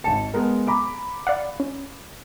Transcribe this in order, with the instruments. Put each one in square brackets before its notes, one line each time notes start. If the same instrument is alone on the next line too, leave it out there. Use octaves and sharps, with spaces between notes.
[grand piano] G#1 A5 [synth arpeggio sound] C#7
[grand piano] G#3 B3 A#4
A#5 B5 D6
[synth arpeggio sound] D5 F5 F#5
C#4